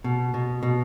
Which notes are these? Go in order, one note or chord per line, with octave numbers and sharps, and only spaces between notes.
B2
B2
B2